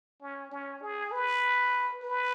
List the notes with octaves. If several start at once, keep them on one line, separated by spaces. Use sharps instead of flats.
C#4
C#4
G#4
B4
B4